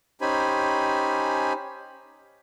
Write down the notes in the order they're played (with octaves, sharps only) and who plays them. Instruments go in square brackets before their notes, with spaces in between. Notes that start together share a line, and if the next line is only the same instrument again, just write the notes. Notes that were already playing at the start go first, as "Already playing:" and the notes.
[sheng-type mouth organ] C#4 D#4 G4 C5 G#5 B5